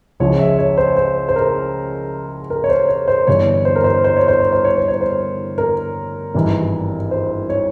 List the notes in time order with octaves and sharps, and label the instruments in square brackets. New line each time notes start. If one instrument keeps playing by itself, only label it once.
[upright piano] C#2 C#3 F3 C#5
E5
C#5
C5
C5
C5
A#4
A#4
C#5
C5
C#5
C5
G1 G2 E3 C#5
C5
A#4
C5
C5
C#5
C5
C#5
C5
C#5
C5
C#5
C5
A#4
G#1 G2 E3
C5
C#5